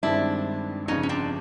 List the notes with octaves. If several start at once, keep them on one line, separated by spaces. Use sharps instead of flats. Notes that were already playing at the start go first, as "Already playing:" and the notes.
G2 D#3 G#3 C4 D4 E4
G1 F2 C#3 C#4 D#4
C#4
C4 D4